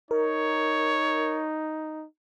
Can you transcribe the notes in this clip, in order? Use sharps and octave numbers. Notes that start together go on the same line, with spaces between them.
D#4 A#4 C#5